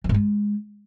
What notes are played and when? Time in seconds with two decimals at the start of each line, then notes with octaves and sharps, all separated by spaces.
0.04 F3
0.09 G#2
0.14 G#3